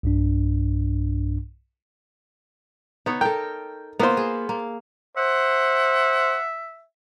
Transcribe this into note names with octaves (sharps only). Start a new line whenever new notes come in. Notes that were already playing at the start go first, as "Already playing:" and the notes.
B1 G2 D4
B3 D#4 C#5
A4 A#4 G5
A#3 B3 F4 C5
G#4
A#3
C5 E5 F#5